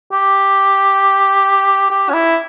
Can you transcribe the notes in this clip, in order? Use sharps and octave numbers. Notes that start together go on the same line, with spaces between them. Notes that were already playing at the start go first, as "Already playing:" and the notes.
G4
G4
C#4
E4